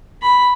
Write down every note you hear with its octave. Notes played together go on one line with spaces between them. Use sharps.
B5